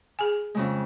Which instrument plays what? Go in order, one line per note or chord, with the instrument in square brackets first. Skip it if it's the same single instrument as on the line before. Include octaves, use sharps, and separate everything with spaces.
[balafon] G#4 G#5
[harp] F2 C#3 G#3